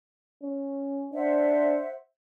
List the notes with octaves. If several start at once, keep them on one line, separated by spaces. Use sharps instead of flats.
C#4
D4 C5 E5 F#5